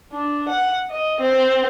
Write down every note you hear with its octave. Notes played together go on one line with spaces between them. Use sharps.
D4
F#5
D#5
C4